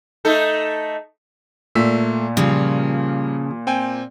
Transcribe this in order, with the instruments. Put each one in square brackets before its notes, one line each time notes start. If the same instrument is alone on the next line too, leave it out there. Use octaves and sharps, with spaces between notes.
[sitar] A3 D#4 A4
[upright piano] A#2 [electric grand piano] A3 E6 B6
[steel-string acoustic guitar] C#3 F3 [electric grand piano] G3
[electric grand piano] C4 G5 G#5